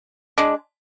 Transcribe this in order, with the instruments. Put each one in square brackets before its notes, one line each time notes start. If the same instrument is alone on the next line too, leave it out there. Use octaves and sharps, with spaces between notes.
[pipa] G#3 D4